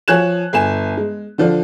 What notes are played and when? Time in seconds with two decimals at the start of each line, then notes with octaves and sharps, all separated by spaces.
0.08 F3 C#5 G#5 F#6 G#6 E7
0.53 G1 G#5 E7
0.97 G#3
1.38 D3 F3 D4